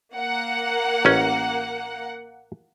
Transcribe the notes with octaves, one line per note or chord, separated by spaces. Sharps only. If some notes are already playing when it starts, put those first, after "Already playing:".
A#3 F#5
A1 C#4